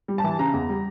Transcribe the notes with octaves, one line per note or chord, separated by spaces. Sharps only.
G3
A5
E3
C#3 A#5
E2
G3